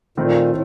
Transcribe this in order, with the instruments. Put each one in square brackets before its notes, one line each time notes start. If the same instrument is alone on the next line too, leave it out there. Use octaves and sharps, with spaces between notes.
[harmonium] A#2 [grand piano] D#3 A3 C4
[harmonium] A2